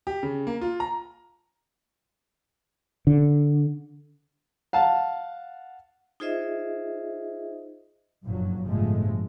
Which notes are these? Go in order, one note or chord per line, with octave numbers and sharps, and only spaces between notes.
G4
C#3
A#3
F4
A#5
D3
F5 F#5 A5
D#4 F4 G#4 C5 D#5 E5
F#1 G2 A#2 F3 F#3
G1 A2 C3 F3 G#3 A3